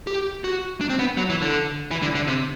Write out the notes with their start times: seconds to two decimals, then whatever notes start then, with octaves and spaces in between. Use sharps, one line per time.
0.07 G4
0.44 F#4
0.81 D4
0.90 C4
0.99 B3
1.17 F#3
1.30 E3
1.42 D3
1.91 E3
2.02 D3
2.15 D3
2.27 C3